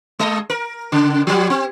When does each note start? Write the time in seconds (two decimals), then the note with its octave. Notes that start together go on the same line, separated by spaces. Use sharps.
0.19 G#3 D#5
0.50 A#4
0.92 C#3
1.27 F3 G3
1.50 C4